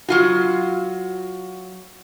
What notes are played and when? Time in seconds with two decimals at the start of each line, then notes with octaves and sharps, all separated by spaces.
0.08 F#3 F4 F#4